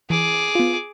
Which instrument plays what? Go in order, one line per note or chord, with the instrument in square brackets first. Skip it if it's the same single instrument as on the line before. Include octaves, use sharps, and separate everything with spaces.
[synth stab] E3 [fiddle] G#4 D6
[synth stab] B3 F4